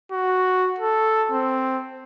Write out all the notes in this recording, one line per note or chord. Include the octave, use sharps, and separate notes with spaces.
F#4
A4
C4